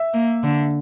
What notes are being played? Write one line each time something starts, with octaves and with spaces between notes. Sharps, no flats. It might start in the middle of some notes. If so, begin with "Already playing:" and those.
Already playing: E5
A#3
D3